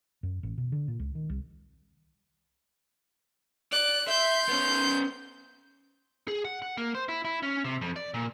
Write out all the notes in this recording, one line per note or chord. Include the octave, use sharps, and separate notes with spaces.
F#2
A1
B2
D3
A#2
C#2
D#3
C2
D5 F#6
E5 C6 G6
B3 C#4
G#4
F#5
F#5
A#3
C5
E4
E4
C#4
C3
F2
D5
A#2